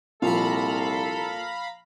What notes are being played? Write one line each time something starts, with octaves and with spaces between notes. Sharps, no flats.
C2 A#2 F3 A4 F5 A#5 B5